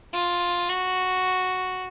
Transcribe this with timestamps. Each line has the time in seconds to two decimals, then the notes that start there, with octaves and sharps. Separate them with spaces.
0.14 F4
0.68 F#4